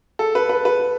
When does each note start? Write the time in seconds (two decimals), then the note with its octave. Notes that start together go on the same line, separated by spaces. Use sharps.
0.19 A4
0.35 B4
0.49 B4
0.65 B4